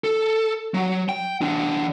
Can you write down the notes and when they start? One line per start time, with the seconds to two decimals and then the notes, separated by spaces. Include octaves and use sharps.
0.04 A4
0.74 F#3
1.09 G5
1.41 E3 D4